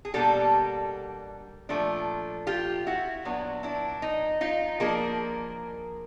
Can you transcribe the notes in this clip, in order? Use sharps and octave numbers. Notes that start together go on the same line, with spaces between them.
G#4
B2 G3 A#3 D4 G4 A4
A#2 F3 A3 D4
F4 G4
E4 F#4
A#2 F#3 B3 D4
D4 E4
D#4
D#4 F4
F3 A#3 D4 G#4 A#4